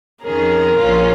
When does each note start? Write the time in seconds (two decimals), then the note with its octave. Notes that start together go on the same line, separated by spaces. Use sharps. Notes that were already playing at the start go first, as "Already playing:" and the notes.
0.24 F2 D#3 C#4 G#4 A#4
0.78 A#1 A#2 F3 C#4 F4